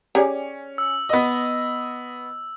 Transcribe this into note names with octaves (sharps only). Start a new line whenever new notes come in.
C#4 G4 G#4 D5
E6
B3 D#5